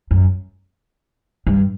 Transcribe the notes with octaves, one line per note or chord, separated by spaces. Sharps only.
F#2
G2